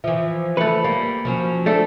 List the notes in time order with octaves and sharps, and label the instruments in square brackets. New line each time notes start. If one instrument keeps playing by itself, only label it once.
[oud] E3 F3 [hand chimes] E5
[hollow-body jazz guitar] A3 B4 [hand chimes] B5 C#7
[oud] G3 [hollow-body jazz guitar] A#3
[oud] F3 F#3 C#4
[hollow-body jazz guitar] A3 D4 A4